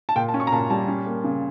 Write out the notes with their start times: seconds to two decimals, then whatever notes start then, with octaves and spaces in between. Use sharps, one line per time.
0.09 A5
0.16 A#2 G5
0.29 A5
0.34 C#4
0.40 C#6
0.47 A#5
0.52 A#2 A5
0.70 G3 A5
0.88 C#4
1.06 A#3
1.24 C#3